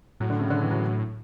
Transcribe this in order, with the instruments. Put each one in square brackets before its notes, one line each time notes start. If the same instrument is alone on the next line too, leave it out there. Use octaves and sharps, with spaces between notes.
[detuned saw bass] A2 [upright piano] F#3
[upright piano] D3
C#3
D3
E3
F#3